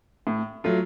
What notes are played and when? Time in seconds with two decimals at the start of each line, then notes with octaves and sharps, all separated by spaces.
0.27 A2
0.64 F#3 A3 F4